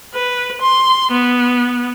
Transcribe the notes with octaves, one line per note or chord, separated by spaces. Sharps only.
B4
C6
B3